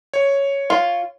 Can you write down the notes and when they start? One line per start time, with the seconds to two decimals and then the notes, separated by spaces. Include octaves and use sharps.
0.14 C#5
0.70 F4